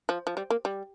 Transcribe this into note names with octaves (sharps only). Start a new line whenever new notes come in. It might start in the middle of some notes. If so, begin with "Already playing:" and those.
F3
F3
G3
A#3
G3